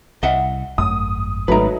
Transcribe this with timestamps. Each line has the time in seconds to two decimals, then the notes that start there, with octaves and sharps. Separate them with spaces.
0.23 C2 D#5 E5 F#5
0.78 G#1 F#2 A3 D#6
1.48 G#1 G#2 F#3 A3 D#4 B4 A#5